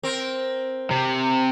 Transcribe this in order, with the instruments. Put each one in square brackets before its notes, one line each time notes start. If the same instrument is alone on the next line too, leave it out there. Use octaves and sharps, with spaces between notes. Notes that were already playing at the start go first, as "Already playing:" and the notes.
[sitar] C4 A#4
[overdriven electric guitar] C3